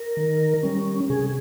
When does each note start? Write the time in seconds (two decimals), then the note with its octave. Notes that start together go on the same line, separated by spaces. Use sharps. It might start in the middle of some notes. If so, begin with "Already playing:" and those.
Already playing: A#4
0.17 D#3
0.63 G3 C#4
1.10 C3 G#4